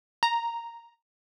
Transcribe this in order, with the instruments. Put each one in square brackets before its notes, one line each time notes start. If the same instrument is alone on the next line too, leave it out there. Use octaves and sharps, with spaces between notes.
[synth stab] A#5